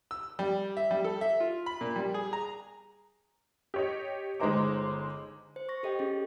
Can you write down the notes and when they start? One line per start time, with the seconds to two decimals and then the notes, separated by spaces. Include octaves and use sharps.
0.11 E6
0.39 G3
0.77 E5
0.91 G3
1.04 A4
1.21 E5
1.40 F4
1.66 B5
1.81 A#2
1.96 G3
2.14 G#4
2.33 A#5
3.74 G4 C#5 D#5
4.40 G1 G#3 D#4 C5 A#5 D6
5.56 C5
5.69 C#6 A#6
5.83 G4 A4 D#5 G5
5.99 C#4 G#4